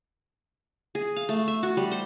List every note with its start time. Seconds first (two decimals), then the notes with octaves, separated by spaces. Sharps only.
0.95 G#4
1.16 F5
1.29 A3
1.48 E5
1.63 F#4
1.77 G3
1.91 C5